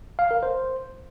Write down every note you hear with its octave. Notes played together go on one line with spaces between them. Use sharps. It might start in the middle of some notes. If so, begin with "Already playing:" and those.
F5
A#4
C5